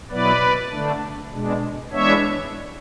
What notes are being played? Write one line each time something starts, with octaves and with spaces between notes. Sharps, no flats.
B2 F#3 B3 E4 B4 D5
D3 A3 D4
B2 G#3 D4
E3 G#3 B3 D4 C#5 E5